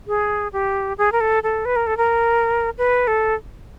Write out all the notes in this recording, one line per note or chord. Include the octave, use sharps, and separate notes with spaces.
G#4
G4
G#4
A#4
A4
A4
B4
A#4
A4
A#4
B4
A4